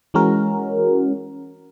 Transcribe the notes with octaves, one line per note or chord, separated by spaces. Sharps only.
E3 G#3 C#4 F#4 A#4